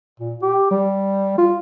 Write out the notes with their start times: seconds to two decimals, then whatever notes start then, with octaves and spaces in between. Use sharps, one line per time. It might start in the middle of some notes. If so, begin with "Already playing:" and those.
0.20 A#2
0.42 G4
0.71 G3
1.38 F4